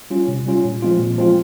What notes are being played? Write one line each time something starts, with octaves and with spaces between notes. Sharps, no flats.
G3 C#4 F4
C3
G3 C#4 F4
A#2
F3 G#3 C4 F4
A#2
F3 G#3 C4 F4